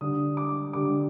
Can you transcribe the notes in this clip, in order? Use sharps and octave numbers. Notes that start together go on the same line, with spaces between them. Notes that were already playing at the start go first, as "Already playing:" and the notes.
D3 G3 D4 D#6
D6
D3 G3 D4 D6